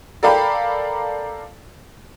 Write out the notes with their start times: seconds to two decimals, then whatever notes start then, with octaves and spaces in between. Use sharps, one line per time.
0.23 A4 A#4 D5 F5 G5 B5